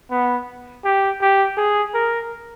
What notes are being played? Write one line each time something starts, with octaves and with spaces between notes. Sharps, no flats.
B3
G4
G4
G#4
A#4